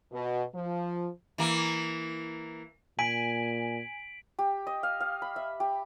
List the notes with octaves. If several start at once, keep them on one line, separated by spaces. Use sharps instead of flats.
B2
F3
E3 A#3
A#2 G#5 B6 D7 F#7
G4
D#5
F5
F5
B5
E5
G4